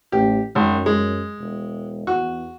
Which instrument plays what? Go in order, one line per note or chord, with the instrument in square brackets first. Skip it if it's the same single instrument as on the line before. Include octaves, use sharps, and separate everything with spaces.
[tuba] A1 [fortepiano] G4
[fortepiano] G#1 [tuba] F#2
[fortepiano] G#3
[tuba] E1
[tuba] E2 [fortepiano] F#4